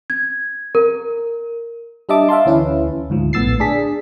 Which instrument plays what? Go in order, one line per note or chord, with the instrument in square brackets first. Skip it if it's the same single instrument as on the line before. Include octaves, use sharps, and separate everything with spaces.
[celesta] G#6
A#4
[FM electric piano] G3 D4 D#5 E5 A5 D6
E5 F5 A5 C6
D2 E3 C#4 E4 B4
D2 G#2 F3
A#1 A2 B3 E6 A6 C7
D4 G#4 B6